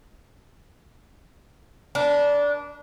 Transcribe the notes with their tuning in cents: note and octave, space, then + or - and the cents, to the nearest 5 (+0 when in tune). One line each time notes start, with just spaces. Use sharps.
D4 -15 A#4 +40